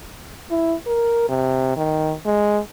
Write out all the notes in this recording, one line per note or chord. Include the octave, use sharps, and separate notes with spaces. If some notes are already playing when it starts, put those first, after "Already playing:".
E4
A#4
C3
D#3
G#3